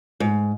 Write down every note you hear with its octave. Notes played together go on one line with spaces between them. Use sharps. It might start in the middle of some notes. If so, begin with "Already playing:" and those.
G#2